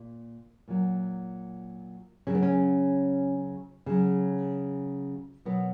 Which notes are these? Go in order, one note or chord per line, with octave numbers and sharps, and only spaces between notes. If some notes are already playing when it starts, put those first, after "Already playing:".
Already playing: A#2
A#2 F#3
C#3 F#3 C#4
B3
C#4
C#3 F#3
B2 F#3 B3